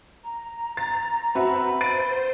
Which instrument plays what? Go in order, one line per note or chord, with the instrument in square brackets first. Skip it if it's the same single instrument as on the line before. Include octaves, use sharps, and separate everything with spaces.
[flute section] A#5
[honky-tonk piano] A6
[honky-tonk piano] C4 F#4 E5 [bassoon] B4
[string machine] C5 [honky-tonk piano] A6 D7 D#7